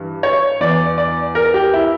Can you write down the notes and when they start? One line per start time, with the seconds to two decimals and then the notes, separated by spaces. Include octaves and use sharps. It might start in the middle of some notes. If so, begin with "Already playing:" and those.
Already playing: G2 E3
0.23 C#5
0.60 E2 E3 D5
0.98 D5
1.35 A#4
1.54 G4
1.73 E4